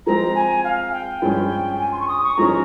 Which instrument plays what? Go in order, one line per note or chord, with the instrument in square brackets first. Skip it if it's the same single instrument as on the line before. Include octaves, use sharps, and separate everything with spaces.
[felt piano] F3 G#3 C4 [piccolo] A#5
[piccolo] G#5
F5
G5
[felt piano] G2 F3 G#3 C#4 G#4
[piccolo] G#5
C6
C#6
D#6
C#6
[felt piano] G#2 F3 G#3 C#4 [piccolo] A#5